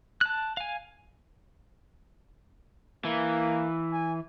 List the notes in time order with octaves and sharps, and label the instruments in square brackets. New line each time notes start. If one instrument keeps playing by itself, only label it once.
[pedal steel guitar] A5 F#6
F5 G#5
[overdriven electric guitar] E3 [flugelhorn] A#3
[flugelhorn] G#5